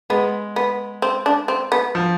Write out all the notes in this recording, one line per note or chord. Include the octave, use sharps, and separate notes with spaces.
G#3 B3
B3
C4
D4
C4
B3
F3